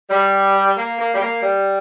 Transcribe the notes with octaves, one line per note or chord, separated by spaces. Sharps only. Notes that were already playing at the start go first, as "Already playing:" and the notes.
G3
A#3
A#3
G3
A#3
G3